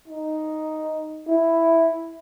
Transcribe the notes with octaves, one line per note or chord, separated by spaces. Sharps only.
D#4
E4